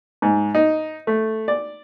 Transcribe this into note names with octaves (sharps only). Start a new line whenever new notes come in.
G#2
D#4
A3
D5